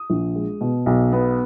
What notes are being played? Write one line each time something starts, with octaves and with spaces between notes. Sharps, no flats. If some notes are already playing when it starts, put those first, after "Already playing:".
Already playing: D#6
A#1
G#3
B2
B1
B3